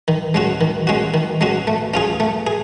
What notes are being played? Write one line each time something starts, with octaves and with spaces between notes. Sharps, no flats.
D#3
G#3 C#4 F#4
D#3
G#3 C#4 F#4
D#3
G#3 C#4 F#4
A3
C#4 F4 G#4
A3
G#4